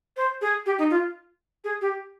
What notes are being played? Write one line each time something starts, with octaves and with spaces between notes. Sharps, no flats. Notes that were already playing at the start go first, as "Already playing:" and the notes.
C5
G#4
G4
D#4
F4
G#4
G4